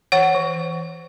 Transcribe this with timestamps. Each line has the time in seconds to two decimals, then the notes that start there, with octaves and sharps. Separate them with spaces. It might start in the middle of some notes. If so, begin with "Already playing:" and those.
0.12 E3 C#5 F#5
0.35 E3